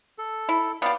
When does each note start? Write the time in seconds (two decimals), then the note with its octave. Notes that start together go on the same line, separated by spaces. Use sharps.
0.18 A4
0.49 E4
0.82 B3 G4 D5 F5